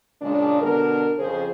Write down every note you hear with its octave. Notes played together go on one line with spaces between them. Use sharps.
A#2 C#3 G#3 D4
B2 D3 D4 A#4
F2 C#3 F3 G#4 C5